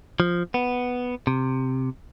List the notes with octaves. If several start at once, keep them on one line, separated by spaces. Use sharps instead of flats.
F3
B3
C3